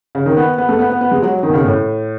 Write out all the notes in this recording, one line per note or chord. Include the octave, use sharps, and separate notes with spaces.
C#3
D#3
B3
B3
A3
B3
B3
B3
G#3
F#3
D#3
B2
C#3
A2